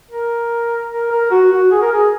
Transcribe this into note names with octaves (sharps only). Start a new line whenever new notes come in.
A#4
A#4
A#4
F#4
F#4
G#4
A#4
G#4